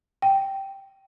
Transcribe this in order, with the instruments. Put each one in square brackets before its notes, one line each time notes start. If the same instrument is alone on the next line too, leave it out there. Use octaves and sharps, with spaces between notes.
[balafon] G5